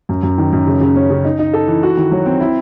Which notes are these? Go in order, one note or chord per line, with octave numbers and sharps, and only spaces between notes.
F#2
F#2
D#3
F#2
C#3
C#3
C#4
C#3
D#4
D#4
A4
E3
F#4
D#3
F#3
C4
E4